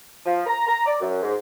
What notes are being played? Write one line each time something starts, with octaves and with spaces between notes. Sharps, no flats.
F3
A#5
A#5
D5
F#2
G#2